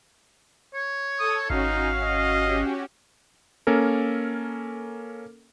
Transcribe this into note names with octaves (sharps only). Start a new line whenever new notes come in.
C#5
A4 D#6
G#1 C#4 D#4 F#4 F5
D#5
C#4 F#4 G4
A#3 C#4 A4 A#4